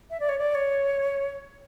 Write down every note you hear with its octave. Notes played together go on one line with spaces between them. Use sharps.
E5
D5
C#5
D5
C#5